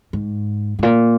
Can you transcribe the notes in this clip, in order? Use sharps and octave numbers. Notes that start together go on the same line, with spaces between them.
G#2
G#2
A#2